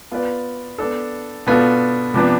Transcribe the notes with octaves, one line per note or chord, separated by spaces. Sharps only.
B3 F4 B4 D5
B3 D4 A4
B2 B3 D4 F4 A4
C3 F3 B3 D4